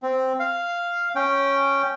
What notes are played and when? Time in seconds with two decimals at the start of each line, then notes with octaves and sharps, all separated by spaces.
0.03 C4
0.39 F5
1.15 C#4 G5